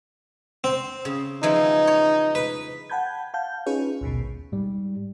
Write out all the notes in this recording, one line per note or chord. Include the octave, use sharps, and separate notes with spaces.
C4
C#3
E3 F3 G#3 D#4
C#5
B4
F#5 G5 A5 B5 G6 G#6
F5 F#5 A5 G6
C#4 D#4 F4 G#4 B4 C#5
A#1 D#2 G#2 B2
G#2 G3